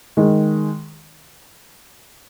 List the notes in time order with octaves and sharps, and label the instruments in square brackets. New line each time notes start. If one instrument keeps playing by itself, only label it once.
[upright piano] D#3 G#3